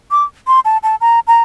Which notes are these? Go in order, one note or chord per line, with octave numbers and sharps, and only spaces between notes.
D6
C6
A5
A5
A#5
A#5